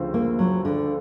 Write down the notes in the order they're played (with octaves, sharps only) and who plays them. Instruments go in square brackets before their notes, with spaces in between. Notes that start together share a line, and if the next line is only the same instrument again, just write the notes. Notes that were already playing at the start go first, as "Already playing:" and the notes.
Already playing: [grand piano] D2 C#3 F3 A3 C4
[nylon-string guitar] A#3
F#3
D3